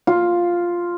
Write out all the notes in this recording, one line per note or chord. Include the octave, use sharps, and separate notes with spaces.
F4